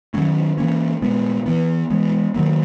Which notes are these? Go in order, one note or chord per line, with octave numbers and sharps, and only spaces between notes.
D#3 F#3 A#3 C#4
E3 A#3 C#4
A#2 G#3 B3
E3 B3
E3 G#3 B3
D#3 F#3 A#3